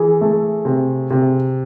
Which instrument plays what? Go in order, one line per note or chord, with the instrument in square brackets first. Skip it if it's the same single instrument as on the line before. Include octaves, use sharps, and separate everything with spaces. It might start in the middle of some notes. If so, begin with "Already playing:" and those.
Already playing: [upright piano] E3 [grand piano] G#4
[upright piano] A3
C3
C3